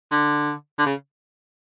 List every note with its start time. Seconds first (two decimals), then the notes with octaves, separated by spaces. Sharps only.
0.11 D3
0.79 D3
0.86 C#3